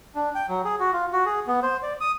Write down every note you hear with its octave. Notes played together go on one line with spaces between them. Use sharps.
D4
G5
F#3
G#4
F#4
F4
F#4
G#4
B3
C5
D5
D#6